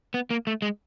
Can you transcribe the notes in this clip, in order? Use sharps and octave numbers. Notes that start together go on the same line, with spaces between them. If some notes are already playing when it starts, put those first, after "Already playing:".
B3
A#3
A3
G#3